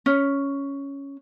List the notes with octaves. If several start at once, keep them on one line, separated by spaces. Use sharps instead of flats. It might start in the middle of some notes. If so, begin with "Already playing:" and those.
C#4